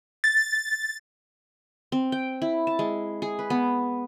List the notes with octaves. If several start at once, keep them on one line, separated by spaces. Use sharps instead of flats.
A6
C4
G5
E4
A5
G#3
G#4
B4
B3